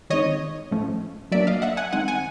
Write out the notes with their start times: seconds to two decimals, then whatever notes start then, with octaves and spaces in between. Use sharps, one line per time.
0.10 D#3 G#3 C4 D#4 C#5 D#5
0.71 A2 F3 A3 C#4
1.32 F#3 A#3 D4 D5 E5
1.47 D#5 F5
1.62 E5 F#5
1.77 F#5 G#5
1.93 D#3 G#3 C4 F#5 G#5
2.08 F#5 G#5